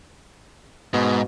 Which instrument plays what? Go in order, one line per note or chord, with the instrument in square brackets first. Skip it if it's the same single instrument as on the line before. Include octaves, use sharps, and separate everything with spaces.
[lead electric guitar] G#2 [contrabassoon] B2